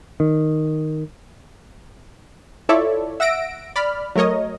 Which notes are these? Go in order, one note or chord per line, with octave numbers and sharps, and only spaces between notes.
D#3
E4 F4 A4 C#5 D5 E5
E5 F#5 E6 A#6 D7
D5 B5 F6
F#3 A3 A#4 C#5 D#5